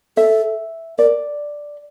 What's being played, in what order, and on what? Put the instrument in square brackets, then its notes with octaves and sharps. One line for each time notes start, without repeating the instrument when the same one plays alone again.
[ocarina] A4 [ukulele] E5
[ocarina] A#4 [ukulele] D5